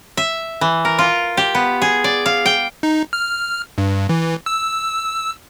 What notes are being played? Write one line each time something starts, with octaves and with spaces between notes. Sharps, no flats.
E5
E3
A#4
F4
G4
B3
G#4
D5
F5
G5
D#4
F6
G2
E3
E6